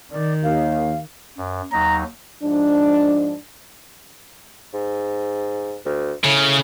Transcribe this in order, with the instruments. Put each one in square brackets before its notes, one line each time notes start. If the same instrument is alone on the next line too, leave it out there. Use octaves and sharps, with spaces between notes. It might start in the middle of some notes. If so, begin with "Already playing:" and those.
[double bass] D#3 [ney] D5
[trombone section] D#2 [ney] F5
[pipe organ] F#2
[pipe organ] D#2 F#3 D#4 [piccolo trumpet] A#5
[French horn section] G#2 F3 D4
[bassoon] G#2
D2
[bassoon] A2 [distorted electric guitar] C#3